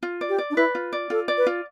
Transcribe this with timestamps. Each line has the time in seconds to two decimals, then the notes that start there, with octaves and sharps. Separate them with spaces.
0.03 F4
0.21 D5
0.29 G4
0.38 D5
0.50 D4
0.56 E4 B4
0.75 F4
0.93 D5
1.10 F4 A4
1.28 D5
1.38 B4
1.47 F4